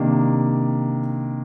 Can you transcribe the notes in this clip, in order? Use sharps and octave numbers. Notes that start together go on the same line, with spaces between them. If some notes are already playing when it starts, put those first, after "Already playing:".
Already playing: C3 D#3 A#3 D4